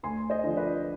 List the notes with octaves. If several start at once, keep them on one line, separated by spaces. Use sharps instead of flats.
D2 G#5 C6
C5 D#5
D3 F3
B4 D5